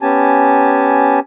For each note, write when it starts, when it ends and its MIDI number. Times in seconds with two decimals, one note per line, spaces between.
0.02 1.20 59
0.02 1.20 61
0.02 1.20 67
0.02 1.20 80
0.02 1.20 81